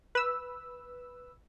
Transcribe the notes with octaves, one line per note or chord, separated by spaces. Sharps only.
B4 E6